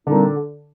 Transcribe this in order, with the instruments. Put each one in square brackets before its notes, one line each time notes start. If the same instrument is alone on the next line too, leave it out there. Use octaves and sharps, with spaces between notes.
[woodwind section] A#2 G3 C4 D#4 [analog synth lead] D3